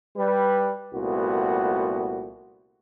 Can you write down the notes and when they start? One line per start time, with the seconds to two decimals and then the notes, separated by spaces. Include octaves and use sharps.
0.17 G3 B4
0.94 C2 A#2 A3 B3 F#4